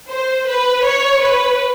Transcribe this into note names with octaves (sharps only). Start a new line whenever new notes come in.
C5
B4
C#5
B4